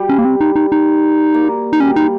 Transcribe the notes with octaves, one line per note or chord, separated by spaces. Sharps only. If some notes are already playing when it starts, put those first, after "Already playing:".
Already playing: G3
C#4
A#3
C4
D#4
D#4
D#4
A#3
D#4
G3 C#4
D#4